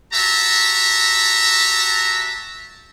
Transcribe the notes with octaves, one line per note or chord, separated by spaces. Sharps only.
F#4 G4 E5 A5 A#5